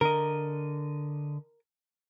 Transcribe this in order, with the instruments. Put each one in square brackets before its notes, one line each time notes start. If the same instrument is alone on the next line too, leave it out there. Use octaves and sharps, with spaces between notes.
[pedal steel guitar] D3 D#5 [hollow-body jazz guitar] A#4